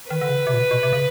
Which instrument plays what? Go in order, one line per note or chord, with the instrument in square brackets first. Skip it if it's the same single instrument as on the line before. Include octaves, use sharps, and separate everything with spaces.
[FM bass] D#3 [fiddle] B4
[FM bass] D3
C#3
C3
A#2
B2
B2
C3
C#3